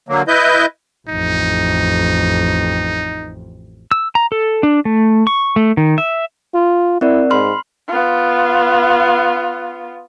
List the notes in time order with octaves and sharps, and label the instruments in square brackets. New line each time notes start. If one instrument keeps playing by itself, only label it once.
[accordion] D3 F#3 A#3
E4 B4 D#5 G6
[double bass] A1 F2 [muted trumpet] D#4
[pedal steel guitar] E6
A#5
A4
D4
A3
C#6
A3
D#3
E5
[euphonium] F4
[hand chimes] C4 A#4 D5 [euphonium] E4
[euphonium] G#2 [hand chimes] B5 C6 F6
[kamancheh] B3 F4